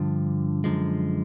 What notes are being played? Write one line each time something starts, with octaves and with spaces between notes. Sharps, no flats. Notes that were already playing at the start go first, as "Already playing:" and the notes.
Already playing: G2 D3 F3
F#2 D3 F3 G#3